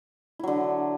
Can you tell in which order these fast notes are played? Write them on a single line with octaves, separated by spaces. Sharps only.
E4 F#3 D3